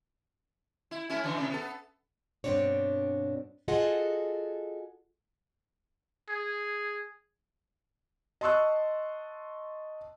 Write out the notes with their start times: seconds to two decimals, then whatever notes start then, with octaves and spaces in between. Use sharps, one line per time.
0.91 E4
1.10 A3 C#4 E4
1.23 C#3 E3 D4
1.36 A2 C3
1.50 B3 A4
2.44 G2 B2 F3 C4 D4 C#5
3.68 F4 F#4 G#4 A4 D#5 F#5
6.29 G#4
8.41 D#5 A5 C6 C#6 E6 F#6